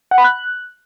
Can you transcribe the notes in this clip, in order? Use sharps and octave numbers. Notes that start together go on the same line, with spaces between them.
F#5
B5
F#6